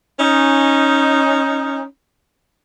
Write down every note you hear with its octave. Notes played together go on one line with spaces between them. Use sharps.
C#4 D#4